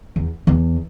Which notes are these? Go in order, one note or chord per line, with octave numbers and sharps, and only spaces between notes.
E2
E2